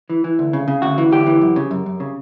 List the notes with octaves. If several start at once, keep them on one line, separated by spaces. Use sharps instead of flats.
E3
E3
D2
C#3
C#3
D2 F#4
E3
D2 G4
E3
F#2
C#3
F#2
F#2
C#3